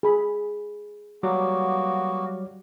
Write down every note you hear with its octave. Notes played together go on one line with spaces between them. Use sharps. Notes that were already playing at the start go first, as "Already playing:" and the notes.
G#4 B5
F#3 G3 A#3 B3 F#4 D6